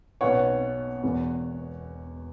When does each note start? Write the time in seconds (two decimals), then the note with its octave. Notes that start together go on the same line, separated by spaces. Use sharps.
0.21 B1 B2 B3 C#5 F#5
1.02 E1 E2 B2 B3